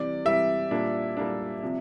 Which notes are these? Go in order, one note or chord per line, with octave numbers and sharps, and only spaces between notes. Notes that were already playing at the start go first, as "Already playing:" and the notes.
Already playing: C3 E3 G3 D5
C3 E3 G3 E5
A#2 G3 A#3 D4
A#2 G3 A#3 D4
C3 F3